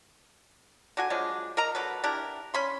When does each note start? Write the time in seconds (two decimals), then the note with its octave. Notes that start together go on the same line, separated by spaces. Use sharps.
0.97 D3 F#4 G#5
1.10 F3 F#3 G#3 D4
1.57 A#4 D#5 A#5
1.75 D3 F#3 A4 B4
2.04 D4 E4 G4 A#4
2.54 C#4 B5 C6